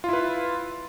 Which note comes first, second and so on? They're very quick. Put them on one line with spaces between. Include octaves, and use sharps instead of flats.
F4 E4 B4